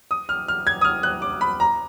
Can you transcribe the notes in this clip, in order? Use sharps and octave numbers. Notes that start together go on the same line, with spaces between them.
D#6
F6
F6
G#6
D#6
F6
F#6
D6
B5
A#5